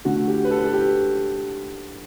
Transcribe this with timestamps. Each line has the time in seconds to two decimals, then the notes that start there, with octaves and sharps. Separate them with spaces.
0.05 D3 A3 F#4
0.28 G4
0.45 B4
0.51 A4
0.59 B4
0.65 A4
0.73 G4